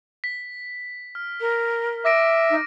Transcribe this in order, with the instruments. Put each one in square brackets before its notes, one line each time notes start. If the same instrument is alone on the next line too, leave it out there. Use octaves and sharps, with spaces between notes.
[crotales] B6
F6
[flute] A#4
[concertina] E5 [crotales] D6 A#6 D7
[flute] D#4